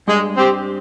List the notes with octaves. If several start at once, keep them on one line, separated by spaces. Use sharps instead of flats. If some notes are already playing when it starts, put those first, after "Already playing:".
G2 G#3
C4 G4